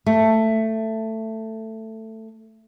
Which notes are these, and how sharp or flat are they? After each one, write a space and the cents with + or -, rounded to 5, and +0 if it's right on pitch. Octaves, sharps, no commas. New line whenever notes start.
A3 +10